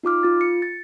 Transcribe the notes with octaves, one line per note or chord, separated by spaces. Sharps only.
D#4 F4 D6 F6
F4 A6
C#7
A6